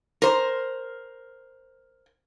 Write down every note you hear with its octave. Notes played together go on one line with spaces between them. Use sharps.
A#4 C5